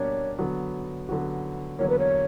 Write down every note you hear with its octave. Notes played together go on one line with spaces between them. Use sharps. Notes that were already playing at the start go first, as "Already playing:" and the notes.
Already playing: B2 G3 A#3 D4 C#5
D3 F#3 B3 F#4
D3 F#3 B3 F#4
E2 D3 F#3 A#3 C#5
B4
C#5